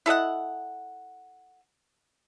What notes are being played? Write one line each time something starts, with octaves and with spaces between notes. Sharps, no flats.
E4 A4 D#5 F#5